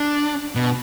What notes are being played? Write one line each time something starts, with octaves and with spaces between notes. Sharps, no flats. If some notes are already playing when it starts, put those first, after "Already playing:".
Already playing: D4
B2